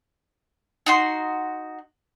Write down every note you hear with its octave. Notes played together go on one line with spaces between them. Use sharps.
D#4 F#4 C6